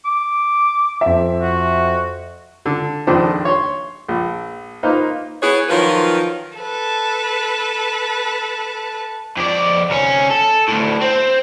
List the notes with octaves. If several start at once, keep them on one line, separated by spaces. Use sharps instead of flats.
D6
F2 E5
F#4
D3
A#1 F2 D#3 D4 A4 C5
C#5 C6
A#1
A#3 D#4 F4 B4 C5
B3 E4 F#4 G#4 B4 C#5
D#3 F3 F#3 F4 A#4 B4
A4 B4
F2 D5
C2 C#4
A4
D2 A2
C4